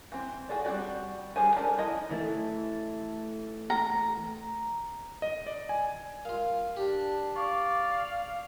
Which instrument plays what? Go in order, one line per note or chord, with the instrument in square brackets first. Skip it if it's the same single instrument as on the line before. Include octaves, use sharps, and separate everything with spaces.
[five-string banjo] E3 C4
F#4 G#4 A4 D5
G3 C4 E4 F#4 D5
D#3 G3 G#4 C5 G#5
C#4 A4 A#4 D5
F3 D#4 E4 D#5
[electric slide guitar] E3 A3
[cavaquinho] A#5
[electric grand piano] D#5
D5
G#5
[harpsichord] F4 F5 [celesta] A#4
[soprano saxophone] D4 [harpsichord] G4
[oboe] D5 [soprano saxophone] F5 [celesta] C#6 D6